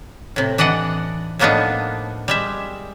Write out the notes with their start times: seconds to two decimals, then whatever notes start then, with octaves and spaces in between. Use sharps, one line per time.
0.36 A2 C3
0.58 E3 D4 D5 D#5 F#5
1.39 A2 F3 A#3 B3 D4 D#4
2.28 G3 G#3 E5